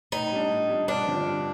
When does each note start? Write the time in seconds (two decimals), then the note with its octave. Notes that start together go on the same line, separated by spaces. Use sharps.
0.12 A2 D#4
0.32 G3 D4
0.51 A2
0.69 G3 D4
0.87 G2 D4
1.07 D3 F3 C4
1.26 G2